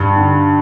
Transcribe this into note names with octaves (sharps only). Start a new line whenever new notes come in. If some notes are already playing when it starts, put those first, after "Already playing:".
Already playing: G2
D3